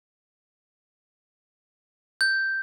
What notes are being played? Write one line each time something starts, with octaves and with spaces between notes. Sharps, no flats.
G6